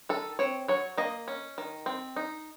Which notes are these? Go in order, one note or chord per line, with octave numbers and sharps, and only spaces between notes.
D#3 A4
C4 C#5
F#3 C#5
A#3 D#5
C#4
D#3
C4
D#4